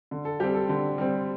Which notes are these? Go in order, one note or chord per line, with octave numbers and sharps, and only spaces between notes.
D3
A4
G3 C4 G4
A4
D3
G3 C4